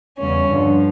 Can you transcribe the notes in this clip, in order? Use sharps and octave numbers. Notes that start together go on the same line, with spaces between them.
E2 C#3 G3 C#4
G2 D3 F3